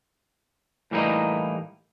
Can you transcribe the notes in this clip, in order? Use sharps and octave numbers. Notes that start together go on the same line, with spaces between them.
A2 E3 G3 A#3 D#4